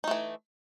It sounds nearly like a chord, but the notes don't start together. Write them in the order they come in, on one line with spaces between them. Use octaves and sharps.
D#4 A3 E3